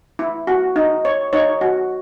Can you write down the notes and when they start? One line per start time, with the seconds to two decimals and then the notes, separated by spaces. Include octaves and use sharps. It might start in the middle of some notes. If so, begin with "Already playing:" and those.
0.19 E4
0.47 F#4
0.76 D#4
1.05 C#5
1.33 D#4 C#5
1.61 F#4